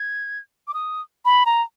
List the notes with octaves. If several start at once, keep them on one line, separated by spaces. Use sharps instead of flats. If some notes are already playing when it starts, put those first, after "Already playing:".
Already playing: G#6
D6
D#6
B5
A#5